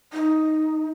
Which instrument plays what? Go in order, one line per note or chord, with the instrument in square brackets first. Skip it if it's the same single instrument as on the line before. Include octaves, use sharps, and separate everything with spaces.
[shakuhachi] D#4